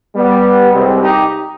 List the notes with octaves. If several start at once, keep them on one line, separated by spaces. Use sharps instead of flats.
G3 B3
C2 C3 G3 G#3 C4
D#4 G4